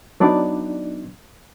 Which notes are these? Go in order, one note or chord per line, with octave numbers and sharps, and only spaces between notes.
F#3 B3 D4 D#4 D5